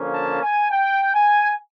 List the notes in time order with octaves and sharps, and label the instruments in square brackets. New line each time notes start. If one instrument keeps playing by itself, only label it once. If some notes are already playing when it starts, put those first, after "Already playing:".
Already playing: [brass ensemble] D3 F3 A#3 C#4
A5
G#5
G5
G#5